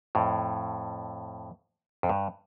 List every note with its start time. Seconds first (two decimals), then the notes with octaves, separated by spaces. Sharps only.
0.15 F2 A2
2.03 F2
2.09 G2